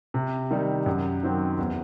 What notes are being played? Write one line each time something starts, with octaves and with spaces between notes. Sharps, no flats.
C3
D#3 G3 D#4
F#2
D#3 F#3 C4
E2